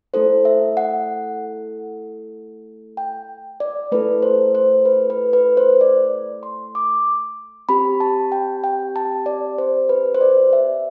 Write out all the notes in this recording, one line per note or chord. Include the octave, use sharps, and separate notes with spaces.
A3 E4 A4 C5
E5
F#5
G5
D5
A3 E4 A4 B4
C5
C5
B4
B4
B4
C5
D5
C6
D6
C4 G4 B5
A5
G5
G5
A5
D5
C5
B4
C5
D5
E5